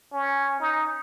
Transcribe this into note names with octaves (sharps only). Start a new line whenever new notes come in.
C#4
D#4